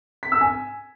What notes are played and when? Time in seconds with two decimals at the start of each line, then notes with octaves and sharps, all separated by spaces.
0.23 B6
0.32 E6
0.41 G#5